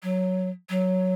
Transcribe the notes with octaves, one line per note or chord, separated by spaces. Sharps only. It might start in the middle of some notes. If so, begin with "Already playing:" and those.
F#3
F#3